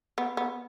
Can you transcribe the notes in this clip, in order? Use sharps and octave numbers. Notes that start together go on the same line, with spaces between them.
B3
B3